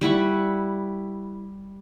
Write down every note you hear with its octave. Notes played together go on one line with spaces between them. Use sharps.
G3 E4 F#5 C#6